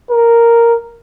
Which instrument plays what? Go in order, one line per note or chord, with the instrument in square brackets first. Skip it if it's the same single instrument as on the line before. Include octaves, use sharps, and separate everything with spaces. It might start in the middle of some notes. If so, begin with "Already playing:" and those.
[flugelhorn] A#4